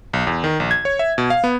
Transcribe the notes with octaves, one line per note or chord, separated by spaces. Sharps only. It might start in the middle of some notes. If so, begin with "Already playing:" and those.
B1
E2
D#3
A#1
G#6
C#5
E5
B2
F5
B3